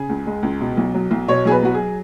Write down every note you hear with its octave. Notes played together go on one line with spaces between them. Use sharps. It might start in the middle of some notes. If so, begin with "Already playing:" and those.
Already playing: C#3 G#4
C#2
G#3
C#2
B2
B1
F#3
B1
B2 C#5
B1 G#4
B4
F#3 F#4
G#4